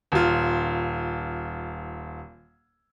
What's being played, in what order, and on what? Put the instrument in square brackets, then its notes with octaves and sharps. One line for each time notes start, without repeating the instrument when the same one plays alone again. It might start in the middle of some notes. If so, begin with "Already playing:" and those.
[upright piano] D#1 F4